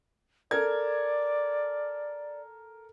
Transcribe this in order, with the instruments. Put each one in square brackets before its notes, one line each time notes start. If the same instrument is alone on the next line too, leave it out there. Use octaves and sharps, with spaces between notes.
[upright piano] A4 A#4 G#6 [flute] D5